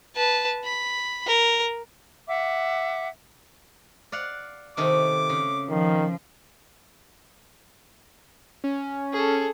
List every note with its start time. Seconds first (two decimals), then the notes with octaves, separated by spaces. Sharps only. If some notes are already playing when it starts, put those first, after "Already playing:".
0.16 B4 A5
0.65 B5
1.27 A#4
2.27 E5 F#5 D6
4.12 D5 F5 F#5
4.77 C3 D#3 A3 D6
5.29 C#3
5.69 D#3 F3
8.64 C#4
9.12 G#4 A4